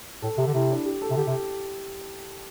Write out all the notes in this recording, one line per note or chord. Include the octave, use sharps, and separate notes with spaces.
A2 A4
C3 G4
D3
C3 E4
D4
G4
A4
C3
D3 G4
C3